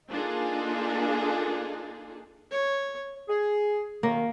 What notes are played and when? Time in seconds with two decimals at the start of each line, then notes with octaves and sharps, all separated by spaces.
0.11 A#3 D4 D#4 F4 G#4 A4
2.52 C#5
3.28 G#4
4.03 F#2 D#3 A#3